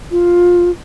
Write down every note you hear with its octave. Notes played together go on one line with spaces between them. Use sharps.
F4